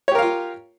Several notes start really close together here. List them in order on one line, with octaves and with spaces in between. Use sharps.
C#5 G4 A#4 F5 F4